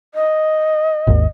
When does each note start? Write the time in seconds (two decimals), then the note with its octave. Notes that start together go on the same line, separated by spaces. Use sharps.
0.15 D#5
1.07 G#1 D#2